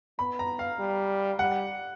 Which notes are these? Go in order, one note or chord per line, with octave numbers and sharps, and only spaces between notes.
B3 B5
A#5
F5
G3
G3 F#5